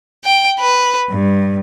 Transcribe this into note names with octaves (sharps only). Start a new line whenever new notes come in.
G5
B4
G2